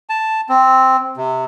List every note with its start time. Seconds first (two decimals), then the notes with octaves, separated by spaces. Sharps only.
0.09 A5
0.49 C4
1.17 C3